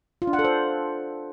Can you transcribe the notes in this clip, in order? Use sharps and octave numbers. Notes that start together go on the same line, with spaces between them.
F4
D4
F#5
A4
C5